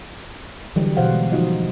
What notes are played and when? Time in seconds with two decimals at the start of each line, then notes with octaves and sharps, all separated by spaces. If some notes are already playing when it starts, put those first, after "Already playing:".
0.76 D3 E3 F#3 G3
0.97 B2 E3 C5 F5 F#5
1.12 G#3
1.32 F3 D#4 F4 F#4 D#5